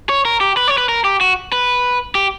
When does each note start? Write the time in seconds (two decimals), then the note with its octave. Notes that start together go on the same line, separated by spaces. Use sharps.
0.09 C#5
0.25 A#4
0.41 G4
0.57 B4
0.68 C#5
0.78 B4
0.89 A#4
1.04 G4
1.21 F#4
1.53 B4
2.15 G4